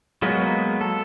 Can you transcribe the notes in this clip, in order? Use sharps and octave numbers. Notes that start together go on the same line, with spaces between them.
F#3 G#3 A#3 B3
A4